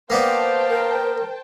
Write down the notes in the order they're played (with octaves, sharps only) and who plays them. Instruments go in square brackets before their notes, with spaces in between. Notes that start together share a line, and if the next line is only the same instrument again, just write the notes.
[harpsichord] A#3 B3 D4 [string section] C5 G5 A5 [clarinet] F5
[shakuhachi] A#4